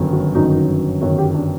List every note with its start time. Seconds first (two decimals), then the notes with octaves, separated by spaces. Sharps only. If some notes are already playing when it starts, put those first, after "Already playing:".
Already playing: G1 F#2 D#3 F#3
0.13 F#4
0.35 G1 F#2 D#3 F#3 D#4
1.01 G1 F#2 D#3 F#3 F#4
1.18 G4
1.35 D4